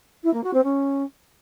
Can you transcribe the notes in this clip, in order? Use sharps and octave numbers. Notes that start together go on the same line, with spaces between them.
E4
A#3
F#4
C4
C#4